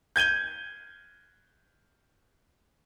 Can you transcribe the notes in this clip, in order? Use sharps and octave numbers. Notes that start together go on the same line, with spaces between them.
G6 G#6 D#7 G7